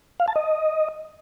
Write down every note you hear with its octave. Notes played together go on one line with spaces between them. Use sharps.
F5
A5
D#5